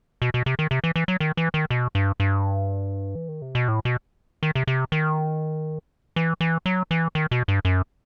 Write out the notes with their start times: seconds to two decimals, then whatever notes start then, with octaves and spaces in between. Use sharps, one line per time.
0.22 B2
0.34 B2
0.46 C3
0.59 D#3
0.71 C3
0.84 E3
0.96 E3
1.08 F#3
1.20 D#3
1.37 E3
1.54 D#3
1.70 B2
1.95 G2
2.20 G2
3.15 E3
3.28 D#3
3.42 C3
3.55 B2
3.68 A2
3.85 B2
4.43 D#3
4.55 C3
4.67 C3
4.92 D#3
6.16 E3
6.41 E3
6.66 F#3
6.91 E3
7.15 D#3
7.31 B2
7.48 G2
7.65 F#2